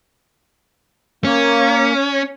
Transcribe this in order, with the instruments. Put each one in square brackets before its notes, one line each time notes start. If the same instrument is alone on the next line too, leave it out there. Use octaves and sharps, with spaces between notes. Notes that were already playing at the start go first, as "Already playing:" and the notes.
[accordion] A#3 [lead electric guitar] C#4